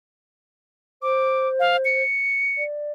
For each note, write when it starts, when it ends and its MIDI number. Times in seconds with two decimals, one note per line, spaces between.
1.02 2.02 72
1.02 1.48 86
1.60 1.77 77
1.85 2.63 97
2.57 2.92 74